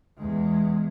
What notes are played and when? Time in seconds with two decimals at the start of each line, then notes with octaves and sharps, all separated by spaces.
0.18 E2 G#3